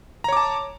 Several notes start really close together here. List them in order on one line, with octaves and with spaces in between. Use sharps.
A#5 C#5 D6 A5